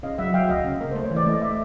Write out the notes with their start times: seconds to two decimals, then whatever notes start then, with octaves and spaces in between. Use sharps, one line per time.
0.03 C#3 D#5 F5
0.18 F#3 E5 F#5
0.34 F#3 F5 G5
0.49 D2 D#5 F5
0.64 C#3
0.81 A#3
0.91 A3 C5
1.04 C#5
1.11 E3
1.16 D5
1.26 A3 D#5
1.42 D5 E5